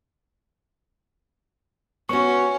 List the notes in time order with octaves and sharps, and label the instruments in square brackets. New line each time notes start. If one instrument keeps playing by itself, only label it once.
[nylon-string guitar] B3 F#4 [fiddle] C#4 [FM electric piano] C#6